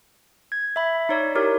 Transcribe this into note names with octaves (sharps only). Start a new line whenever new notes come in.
G#6
E5 B5
D#4 C#5 D5
E4 G4 A#4 C#5